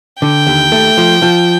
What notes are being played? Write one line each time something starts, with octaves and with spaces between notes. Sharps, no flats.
D3 G5
D#2
A3
F3
F3